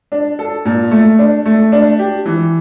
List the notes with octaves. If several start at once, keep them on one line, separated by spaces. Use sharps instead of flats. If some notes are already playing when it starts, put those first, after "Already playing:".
D4
A4
A#2
A3
D4
A3
D4
G4
E3